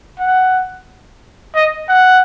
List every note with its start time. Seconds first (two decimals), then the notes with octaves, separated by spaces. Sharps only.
0.19 F#5
1.55 D#5
1.89 F#5